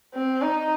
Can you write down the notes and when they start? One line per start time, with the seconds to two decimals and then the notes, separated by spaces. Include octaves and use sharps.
0.14 C4
0.42 D#4